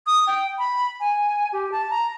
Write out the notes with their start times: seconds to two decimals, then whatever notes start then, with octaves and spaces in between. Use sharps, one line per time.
0.07 D#6
0.27 G5
0.59 B5
1.00 G#5
1.53 G4
1.72 A5
1.91 A#5